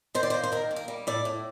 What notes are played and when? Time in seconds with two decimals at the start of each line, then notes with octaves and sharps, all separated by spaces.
0.15 D#3 C5
0.23 D5
0.30 A#3 C5
0.44 C5
0.52 D#3 A#4
0.71 A#3
0.76 A#4
0.88 G3
1.07 A2 D5
1.25 A2